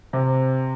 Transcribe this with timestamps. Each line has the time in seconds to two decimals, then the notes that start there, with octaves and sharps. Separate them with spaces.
0.13 C3